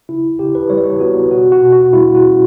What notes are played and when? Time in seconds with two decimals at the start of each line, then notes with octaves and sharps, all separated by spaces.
0.09 C#3 E4
0.39 C#3 G4
0.55 B4
0.70 G3 C#5
0.77 D5
0.84 C#5
1.00 B3 F#4
1.31 B2 F#4
1.52 F#4
1.63 B2
1.73 F#4
1.93 G3 E4
2.14 F#4
2.25 C#4